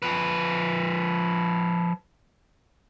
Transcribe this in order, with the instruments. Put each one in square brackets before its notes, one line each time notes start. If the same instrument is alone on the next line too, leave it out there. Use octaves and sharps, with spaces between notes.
[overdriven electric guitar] F3 B4